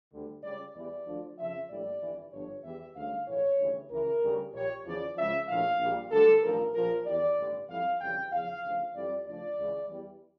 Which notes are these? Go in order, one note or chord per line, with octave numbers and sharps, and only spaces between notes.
D2 D3 G3
C#2 C#3 G3 D5
E2 E3 G3 D5
D2 D3 F3
F2 C#3 F3 E5
A#1 A2 G3 D5
G1 F2 E3 G3
G1 G2 F3 C#5
E2 E3 G3 E5
D2 C#3 G3 F5
A#1 A2 E3 C#5
D2 C#3 E3 G3
C#2 C#3 E3 A#4
D2 C#3 G3
A#1 A#2 G3 C#5
E2 C#3 F3 D5
C#2 C#3 F3 E5
A#1 A2 F3 F5
A#1 A#2 G3
D2 D3 G3 A4
A1 G2 F3 A#4
A#1 A#2 F3 A#4
E2 E3 G3 D5
A1 G2 D3
F2 E3 G3 F5
F2 C#3 E3 G3 G5
E2 C#3 F3 F5
D2 C#3 F3
F2 E3 G3 D5
D2 C#3 F3 D5
C#2 C#3 E3
E2 E3 G3